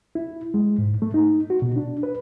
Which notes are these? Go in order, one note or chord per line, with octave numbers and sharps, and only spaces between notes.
E4
G#3
G#2
A3
D#4
F#4
B2
D4
B4